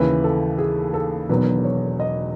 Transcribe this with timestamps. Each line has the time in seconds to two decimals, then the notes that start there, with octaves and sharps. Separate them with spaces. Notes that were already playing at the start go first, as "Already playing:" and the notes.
Already playing: D#2 C#3 E3 B4
0.24 A4
0.58 G#4
0.94 A4
1.29 E1 E2 D#3 F#3 B4
1.64 C#5
2.00 D#5